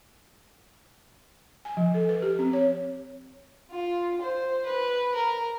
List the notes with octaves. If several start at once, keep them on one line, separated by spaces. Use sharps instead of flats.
G#5
F3
A4
B4
G4
C4
C#5
F4
C5
B4
A#4